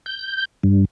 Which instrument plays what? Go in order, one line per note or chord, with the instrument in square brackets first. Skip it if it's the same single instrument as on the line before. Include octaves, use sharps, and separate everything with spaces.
[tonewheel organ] G6
G2